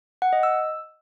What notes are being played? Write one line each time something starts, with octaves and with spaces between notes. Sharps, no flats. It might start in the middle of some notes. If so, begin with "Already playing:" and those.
F#5
D#5
E6